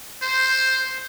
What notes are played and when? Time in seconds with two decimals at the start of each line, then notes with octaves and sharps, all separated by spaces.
0.22 C5